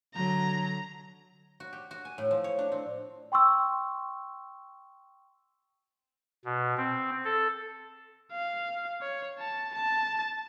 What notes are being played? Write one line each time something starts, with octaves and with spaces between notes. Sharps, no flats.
D3 F#3 A#5
F#4
G4
F#4
G#5
A2
F3
C#5
D4
C4
G5 C6 C#6 E6
B2
C4
A4
F5
C#5
A5
A5